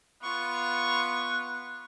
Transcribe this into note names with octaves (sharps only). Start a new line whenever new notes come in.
B3 F4 C#6